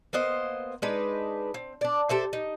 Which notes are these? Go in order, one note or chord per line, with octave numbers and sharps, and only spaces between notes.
A#3 B3 C5 D#5
G#3 D4 D#4 B4
C4
D4 D5
G4 A4 C5 E5
D#4